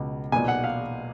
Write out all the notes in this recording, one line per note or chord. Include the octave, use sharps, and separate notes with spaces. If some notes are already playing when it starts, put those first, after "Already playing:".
Already playing: C#2 B2
B1 A#2 G#5
F#5
F5